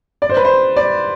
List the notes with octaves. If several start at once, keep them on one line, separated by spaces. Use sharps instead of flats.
D5
C5
B4
C5
D5